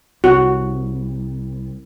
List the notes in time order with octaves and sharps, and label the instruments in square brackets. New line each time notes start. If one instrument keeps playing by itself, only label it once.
[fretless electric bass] C2 [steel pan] F#4